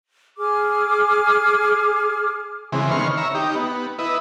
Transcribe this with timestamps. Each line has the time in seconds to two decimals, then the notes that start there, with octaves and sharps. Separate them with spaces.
0.38 G#4 G#5 D6 F6
2.72 C#3 E3 G#3 C4
2.91 D#3 B3 C#5 C6 F6
3.17 C#5 E5 A#5
3.35 D#4 G4
3.55 B3
3.99 E4 B4 D#5